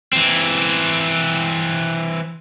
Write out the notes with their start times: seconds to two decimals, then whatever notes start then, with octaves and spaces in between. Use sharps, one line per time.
0.13 E3 C4